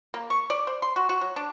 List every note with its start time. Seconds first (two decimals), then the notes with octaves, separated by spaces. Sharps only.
0.14 A#3
0.30 C#6
0.50 D5
0.67 C5
0.82 C6
0.96 F#4
1.09 F#4
1.21 F#3
1.36 D4